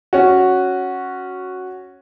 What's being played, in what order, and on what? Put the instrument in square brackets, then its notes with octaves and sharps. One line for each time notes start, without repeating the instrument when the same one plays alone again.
[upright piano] C#4 F#4